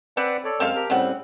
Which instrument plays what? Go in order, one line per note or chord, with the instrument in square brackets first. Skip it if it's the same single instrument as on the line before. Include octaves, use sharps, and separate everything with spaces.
[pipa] C4 [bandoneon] B4 D5 F#5
[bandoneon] A4 C#5 D5
[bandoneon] F#2 G#3 F6 [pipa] C4 A4 F5
[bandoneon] G4 A#4
[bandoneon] A2 G3 C4 [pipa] C#3 F#5